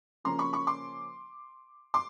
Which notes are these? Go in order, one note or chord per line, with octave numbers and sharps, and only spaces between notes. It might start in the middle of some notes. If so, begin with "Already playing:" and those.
C#3 F3 A#3 C#4 A#5 C6
B5 C#6
B5 C#6
C6 D6
C6 D6